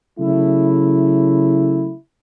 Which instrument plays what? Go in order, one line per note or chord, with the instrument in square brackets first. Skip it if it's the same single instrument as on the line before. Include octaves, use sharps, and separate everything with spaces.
[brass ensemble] C#3 F#3 A3 E4